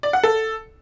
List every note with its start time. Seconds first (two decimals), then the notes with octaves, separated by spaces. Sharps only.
0.03 D5
0.13 F#5
0.24 A4